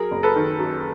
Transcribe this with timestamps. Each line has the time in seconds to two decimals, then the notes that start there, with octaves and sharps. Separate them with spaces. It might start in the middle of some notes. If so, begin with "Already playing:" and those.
Already playing: F#3 G#4 A#4
0.11 F#1
0.23 A4 B4
0.36 D#3
0.59 F#2